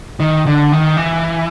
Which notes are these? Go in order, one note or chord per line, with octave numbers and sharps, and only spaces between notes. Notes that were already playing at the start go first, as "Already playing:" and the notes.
D#3
D3
D#3
E3